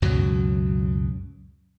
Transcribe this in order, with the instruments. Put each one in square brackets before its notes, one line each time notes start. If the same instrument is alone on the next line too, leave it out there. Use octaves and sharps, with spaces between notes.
[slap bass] C#2 F#2 B2 F#3